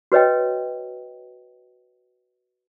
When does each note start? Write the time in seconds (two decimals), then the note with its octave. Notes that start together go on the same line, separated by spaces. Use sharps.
0.12 F#4 B4 C#5 D#5 G5